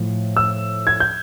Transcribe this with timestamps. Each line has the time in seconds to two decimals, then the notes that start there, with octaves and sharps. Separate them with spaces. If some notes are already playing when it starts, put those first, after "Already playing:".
Already playing: A2 F3
0.37 E6
0.87 G#6
1.00 G6